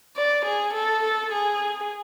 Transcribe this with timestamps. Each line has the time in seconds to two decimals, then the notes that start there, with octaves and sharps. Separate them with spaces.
0.16 D5
0.45 G#4
0.73 A4
1.03 A4
1.32 G#4